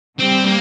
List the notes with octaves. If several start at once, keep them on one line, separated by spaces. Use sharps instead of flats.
G3 C4
A#3